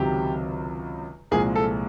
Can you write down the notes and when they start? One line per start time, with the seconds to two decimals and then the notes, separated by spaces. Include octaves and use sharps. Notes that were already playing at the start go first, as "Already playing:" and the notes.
Already playing: C#2 C3 D#3 F#3 G4
1.31 C2 A#2 F3 G#3 G#4
1.56 A4